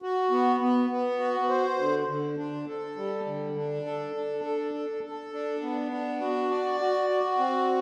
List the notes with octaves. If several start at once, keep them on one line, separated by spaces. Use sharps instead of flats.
F#4
B3
B3
B3
F#4
C5
D3
D3
D4
A4
G3
D3
D4
A4
D4
A4
A4
A4
D4
B3
D4
F#4
D5
F#4
F#4
C4